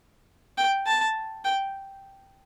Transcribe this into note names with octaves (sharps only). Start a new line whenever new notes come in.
G5
A5
G5